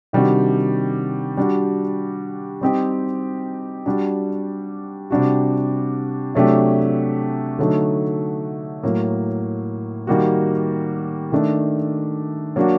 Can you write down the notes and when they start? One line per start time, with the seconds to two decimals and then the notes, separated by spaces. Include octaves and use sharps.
0.13 C3 D#3 G3 D4 F#4
1.37 G3 D4 F#4
2.61 G3 C4 D#4 G4
3.86 G3 D4 F#4
5.10 C3 G3 D4 F#4
6.35 C3 F#3 A3 D4 G4
7.59 D3 F#3 A3 D#4
8.83 A2 F#3 A#3
10.07 D#3 G3 A#3 F#4
11.32 D#3 A3 D4
12.56 F#3 A#3 D4 F#4